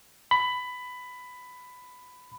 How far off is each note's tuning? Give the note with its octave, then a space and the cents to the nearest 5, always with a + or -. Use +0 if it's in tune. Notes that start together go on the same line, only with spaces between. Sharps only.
B5 +15